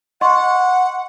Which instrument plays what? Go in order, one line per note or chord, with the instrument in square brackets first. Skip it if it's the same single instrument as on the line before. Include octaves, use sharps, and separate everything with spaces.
[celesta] D#5 C6 C#6 [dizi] F#5